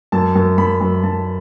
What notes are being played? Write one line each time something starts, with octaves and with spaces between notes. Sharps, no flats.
F#2 A5
F#2
F#2 B5
F#2
F#2 A5